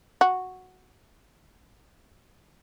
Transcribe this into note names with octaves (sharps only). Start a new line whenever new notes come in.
F#4